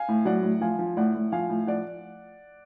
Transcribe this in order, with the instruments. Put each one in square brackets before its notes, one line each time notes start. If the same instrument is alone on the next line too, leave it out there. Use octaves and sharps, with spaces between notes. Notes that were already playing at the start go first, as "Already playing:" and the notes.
Already playing: [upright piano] F5 G#5
A2
F#3 D5 F#5
A2
F3 F5 G#5
F3
A2 D5 F#5
A2
F3 F5 G#5
A2
F3 D5 F#5